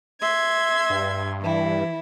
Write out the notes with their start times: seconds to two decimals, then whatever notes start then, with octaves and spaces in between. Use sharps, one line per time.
0.21 E5 C6 G#6
0.90 G2
1.41 E3 E4